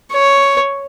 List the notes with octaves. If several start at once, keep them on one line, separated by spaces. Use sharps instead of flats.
C#5